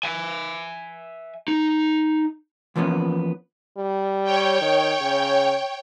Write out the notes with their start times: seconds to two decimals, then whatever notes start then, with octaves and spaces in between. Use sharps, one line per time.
0.03 E5 G#5
1.48 D#4
2.76 E3 F3 A#3 B3 C#4
3.78 G3
4.24 C#5 G5
4.62 D#3
5.01 C#3